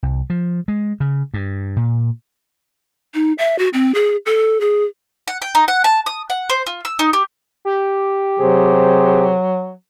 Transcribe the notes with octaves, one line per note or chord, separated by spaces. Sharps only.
C2
F3
G#3
C#3
G2
A#2
D#4
E5
F#4
C4
G#4
A4
G#4
F#5
G5
D#4
F#5
A5
D#6
F#5
C5
F4
E6
D#4
G4
G4
C3 F#3 G#4 C5